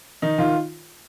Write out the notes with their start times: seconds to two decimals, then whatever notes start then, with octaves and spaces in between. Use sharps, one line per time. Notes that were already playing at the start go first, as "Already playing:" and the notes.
0.22 D#3 D#4
0.38 D#3 F4